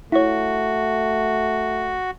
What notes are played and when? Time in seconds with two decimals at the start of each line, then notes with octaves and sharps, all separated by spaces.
0.12 A3 E4 F#4 C#5